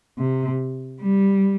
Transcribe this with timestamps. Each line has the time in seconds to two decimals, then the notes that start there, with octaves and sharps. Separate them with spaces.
0.18 C3
1.01 G3